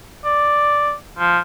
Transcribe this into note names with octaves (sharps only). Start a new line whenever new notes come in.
D5
F3